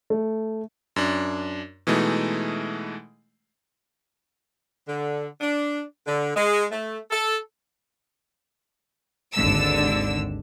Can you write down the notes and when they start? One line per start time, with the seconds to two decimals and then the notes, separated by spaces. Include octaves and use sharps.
0.10 A3
0.96 F#2 D4
1.87 B2 E3 G#3 A3 D#4
4.88 D3
5.41 D4
6.07 D3
6.36 G#3
6.71 A3
7.10 A4
9.35 G#1 D#2 D3 E6